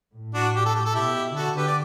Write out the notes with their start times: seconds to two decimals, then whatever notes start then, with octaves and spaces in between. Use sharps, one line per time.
0.14 A2
0.34 D4 F#4
0.55 G4
0.66 A4
0.75 G4
0.86 A4
0.95 B2 E4 G4
1.35 D3 F#4 A4
1.56 G4 B4
1.67 D5